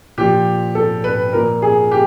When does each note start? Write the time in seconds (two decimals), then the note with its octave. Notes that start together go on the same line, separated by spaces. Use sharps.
0.18 A#2 F3 G4
0.75 A4
1.04 B4
1.33 A#2 F3 A#4
1.62 G#4
1.91 G4